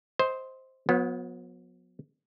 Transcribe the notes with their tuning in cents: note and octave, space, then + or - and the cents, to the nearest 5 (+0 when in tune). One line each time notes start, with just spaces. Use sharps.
C5 +0 D#5 +30
F#3 -45 B3 -10